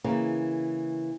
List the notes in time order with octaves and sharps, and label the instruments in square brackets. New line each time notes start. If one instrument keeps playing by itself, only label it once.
[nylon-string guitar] C#3 E3 A#3